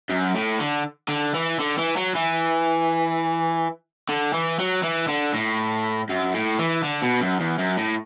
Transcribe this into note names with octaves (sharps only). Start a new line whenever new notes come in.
F#2
A2
D3
D3
E3
D3
E3
F#3
E3
D3
E3
F#3
E3
D3
A2
F#2
A2
E3
D3
B2
F#2
E2
F#2
A2